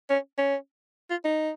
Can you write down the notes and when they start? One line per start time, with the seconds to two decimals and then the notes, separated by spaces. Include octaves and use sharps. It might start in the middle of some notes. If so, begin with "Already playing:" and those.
0.10 C#4
0.38 C#4
1.10 F4
1.25 D#4